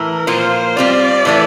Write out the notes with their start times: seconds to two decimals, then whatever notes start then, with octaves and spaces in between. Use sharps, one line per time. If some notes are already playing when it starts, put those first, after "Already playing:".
Already playing: A2 E3 A#4
0.27 A#2 F3 A#3 F4 C5
0.76 G3 C4 F4 D5
1.25 A2 E3 A3